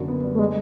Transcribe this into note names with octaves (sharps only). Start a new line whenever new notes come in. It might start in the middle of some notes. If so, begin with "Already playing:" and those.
Already playing: F#2 D3 A#3
B3
G3
A3
G3 G#3